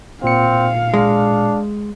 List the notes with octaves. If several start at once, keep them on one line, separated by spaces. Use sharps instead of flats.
A#2 C4 F5 C#7
G#3 D4